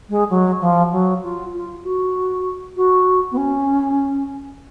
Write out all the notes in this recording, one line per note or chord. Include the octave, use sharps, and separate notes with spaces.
G#3
F#3
F3
F#3
F4
F4
F#4
F#4
B3
C#4